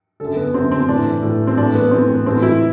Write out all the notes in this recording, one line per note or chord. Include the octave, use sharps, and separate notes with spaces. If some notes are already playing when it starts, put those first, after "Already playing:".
F#2 D3 A4
B3
F#2 D3 C4
C4
A2 E3 D4
A2 E3
C4
A2 E3 D4
B3
A2 E3 C4
B3
A2 E3 C4
E4